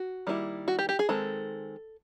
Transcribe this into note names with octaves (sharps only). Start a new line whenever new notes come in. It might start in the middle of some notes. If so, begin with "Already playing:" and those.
Already playing: F#4
D#3 G3 A#3 C#4 E4
F#4
G4
G4
G#4
D#3 G#3 C4 A4